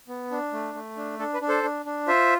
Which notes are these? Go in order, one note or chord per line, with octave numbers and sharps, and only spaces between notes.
B3
D4
A3
A3
D4
D4 A4
B4
D4
A4 C5
D4
D4
F4 C5 E5